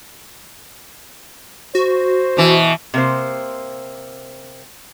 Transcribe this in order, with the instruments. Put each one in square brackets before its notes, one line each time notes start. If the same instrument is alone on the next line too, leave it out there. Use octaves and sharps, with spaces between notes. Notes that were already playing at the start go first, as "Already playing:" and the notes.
[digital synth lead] F#4 [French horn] C5
[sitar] B2 E3
[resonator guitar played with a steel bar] C3 A#3 C5